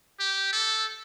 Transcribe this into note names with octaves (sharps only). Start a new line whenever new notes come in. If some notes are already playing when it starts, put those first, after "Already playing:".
G4
A4